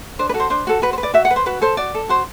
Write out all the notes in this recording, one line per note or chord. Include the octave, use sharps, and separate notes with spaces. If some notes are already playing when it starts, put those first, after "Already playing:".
D4 C5
B4
F#4 A4
C5
D4 C5
F#4 A4
F#4 B4
C5
B4
D5
F#4 E5
F#5
B4
C5
F#4 B4
A4 C5
F#4 D5
A4
F#4 C5